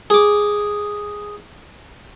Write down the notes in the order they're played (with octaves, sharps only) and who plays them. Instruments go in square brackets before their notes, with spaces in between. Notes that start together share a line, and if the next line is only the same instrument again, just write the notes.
[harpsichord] G#4 D6